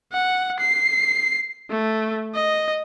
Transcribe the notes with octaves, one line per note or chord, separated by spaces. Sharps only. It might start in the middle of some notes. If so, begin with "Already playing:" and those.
F#5
C7
A3
D#5